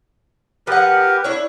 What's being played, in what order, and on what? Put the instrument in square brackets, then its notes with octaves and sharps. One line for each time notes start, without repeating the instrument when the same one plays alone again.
[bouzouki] F3 F#5 [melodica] G4 A#4 B4
[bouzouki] D4 E4 C#5